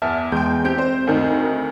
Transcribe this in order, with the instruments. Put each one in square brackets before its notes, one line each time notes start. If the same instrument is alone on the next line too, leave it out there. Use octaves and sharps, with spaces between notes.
[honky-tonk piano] E2 [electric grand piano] E5 A5 F6
[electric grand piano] E2 G#3 [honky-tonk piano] G5 C6 G6
[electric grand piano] C4 [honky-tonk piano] G4 G6 D7
[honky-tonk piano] C5
D2 D#3 D#4